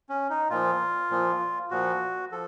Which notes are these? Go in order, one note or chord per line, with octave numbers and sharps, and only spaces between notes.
C#4
D#4
A#2 F3 F4
A#2 F3
A#2 F3 F#4
F3 A4